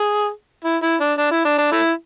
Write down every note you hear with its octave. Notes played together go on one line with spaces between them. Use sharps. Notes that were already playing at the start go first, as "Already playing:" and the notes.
Already playing: G#4
E4
E4
D4
D4
E4
D4
D4
A3 E4